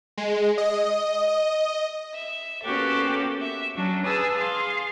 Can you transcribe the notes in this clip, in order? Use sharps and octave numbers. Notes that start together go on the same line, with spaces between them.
G#3
D#5
D#5
E5
A#3 B3 C#4 F#4 G4 A4
E5
F#3 C#4 D4
G#4 B4 G#5 A5 D#6 E6
G#4 F5 C6